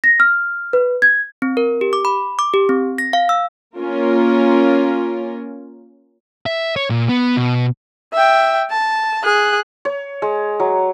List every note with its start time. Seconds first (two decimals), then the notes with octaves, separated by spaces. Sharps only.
0.04 A#6
0.20 F6
0.73 B4
1.02 G#6
1.42 C4
1.57 A#4
1.81 G4
1.93 D6
2.05 B5
2.39 D6
2.54 G4
2.69 C4
2.98 A#6
3.13 F5
3.29 E6
3.77 A#3 C#4 F4 A#4
6.46 E5
6.76 C#5
6.90 A#2
7.09 B3
7.37 B2
8.13 E5 G5
8.70 A5
9.24 G#4 F#6
9.85 C#5
10.22 G#3
10.60 F#3